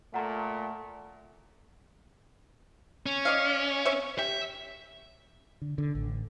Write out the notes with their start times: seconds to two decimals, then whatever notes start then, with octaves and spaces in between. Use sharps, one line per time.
0.14 A#2 A3 F#5 A#5
3.06 C#4
3.25 D5 D#5 F5
3.85 C#5 E5
4.19 G4 E5
5.62 D3
5.78 D3
5.95 A1